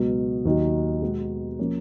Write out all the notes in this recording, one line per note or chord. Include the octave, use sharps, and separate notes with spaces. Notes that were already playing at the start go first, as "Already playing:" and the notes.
Already playing: C#2 B2 F#3
D#2 D#3 F#3
B2 G#3 B3 F#4
F3 A#3 C#4